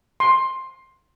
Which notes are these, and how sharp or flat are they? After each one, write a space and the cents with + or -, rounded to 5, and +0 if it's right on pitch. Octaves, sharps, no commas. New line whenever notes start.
C6 +10